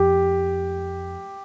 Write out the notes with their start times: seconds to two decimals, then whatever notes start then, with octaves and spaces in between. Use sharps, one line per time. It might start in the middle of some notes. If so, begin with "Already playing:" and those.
Already playing: F2 G4